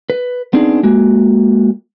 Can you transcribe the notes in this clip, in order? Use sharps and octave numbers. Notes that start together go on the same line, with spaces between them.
B4
B3 C4 D4 D#4 G#4
G#3 A#3 F#4